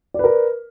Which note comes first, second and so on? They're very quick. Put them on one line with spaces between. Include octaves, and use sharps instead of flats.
D5 B4 A#4